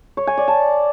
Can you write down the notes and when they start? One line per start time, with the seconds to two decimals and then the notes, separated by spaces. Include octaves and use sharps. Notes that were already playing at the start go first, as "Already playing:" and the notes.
0.17 C#5
0.27 G#5
0.38 D5
0.48 A5